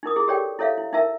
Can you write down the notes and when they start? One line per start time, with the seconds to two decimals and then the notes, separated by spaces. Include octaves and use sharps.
0.03 D#4 E4 A#4 D#6
0.16 E4 G#4
0.28 G4 A4 C#5 D5 G5
0.59 E4 A4 C#5 E5 F5
0.78 E4
0.93 D#4 E4 A#4 E5 A5 E6